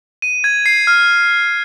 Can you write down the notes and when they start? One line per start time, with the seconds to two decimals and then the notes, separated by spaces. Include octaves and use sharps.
0.22 D#7
0.44 G#6
0.66 C7
0.87 F6